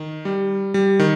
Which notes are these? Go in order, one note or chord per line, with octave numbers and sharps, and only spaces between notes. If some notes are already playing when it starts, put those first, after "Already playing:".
Already playing: D#3
G3
G3
D#3